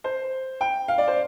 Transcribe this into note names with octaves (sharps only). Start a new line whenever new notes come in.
C5
G5
F5
D5
C5